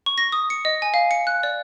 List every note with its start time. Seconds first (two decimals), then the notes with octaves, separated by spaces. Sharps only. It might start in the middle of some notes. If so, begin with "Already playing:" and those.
0.06 C#6
0.18 A#6
0.32 D#6
0.50 C#7
0.65 D#5
0.82 G#5
0.94 F5
1.11 C#7
1.27 F#6
1.43 D5